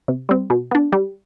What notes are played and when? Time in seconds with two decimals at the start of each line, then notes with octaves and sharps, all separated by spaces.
0.08 C3
0.29 G3 C4
0.50 B2
0.71 B3 D4
0.92 G3